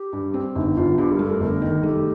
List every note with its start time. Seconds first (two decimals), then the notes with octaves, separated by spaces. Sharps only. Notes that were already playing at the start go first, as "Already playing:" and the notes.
Already playing: G4
0.13 G2
0.34 C4
0.55 G1 D#4
0.76 G1 F4
0.98 G2 G4
1.11 A#4
1.19 A3
1.26 A#4
1.40 G1 A#4
1.62 D#3
1.83 A3 G4